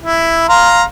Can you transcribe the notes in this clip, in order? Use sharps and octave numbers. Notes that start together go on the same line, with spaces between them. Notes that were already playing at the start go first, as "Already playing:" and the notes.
E4
F5 A#5 C6